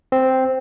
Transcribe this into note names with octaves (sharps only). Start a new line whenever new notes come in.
C4